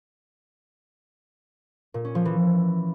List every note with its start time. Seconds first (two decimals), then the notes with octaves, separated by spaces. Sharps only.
1.94 A#2
2.05 C#4
2.15 F3
2.25 E3